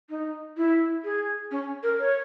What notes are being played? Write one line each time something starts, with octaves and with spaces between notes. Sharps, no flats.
D#4
E4
G#4
C#4
A#4
C#5